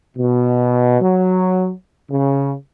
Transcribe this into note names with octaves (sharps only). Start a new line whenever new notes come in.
B2
F#3
C#3